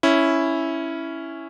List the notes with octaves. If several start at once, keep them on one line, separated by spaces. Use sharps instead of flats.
C#4 E4